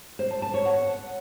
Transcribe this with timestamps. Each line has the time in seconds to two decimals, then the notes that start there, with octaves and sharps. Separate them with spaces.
0.19 C5
0.31 A5
0.42 A5
0.54 C#5
0.65 F#5